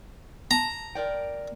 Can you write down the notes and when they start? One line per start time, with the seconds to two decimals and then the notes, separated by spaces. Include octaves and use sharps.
0.51 A5 A#5
0.95 A#4 D5 G5